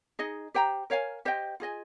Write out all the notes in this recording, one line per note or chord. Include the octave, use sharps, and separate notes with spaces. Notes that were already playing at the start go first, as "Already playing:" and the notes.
D#4 G#4 D#5
G4 C5 G5 A#5
A#4 C#5 F5 G#5
G4 C5 D#5 G5
F4 G#4 D#5 G#5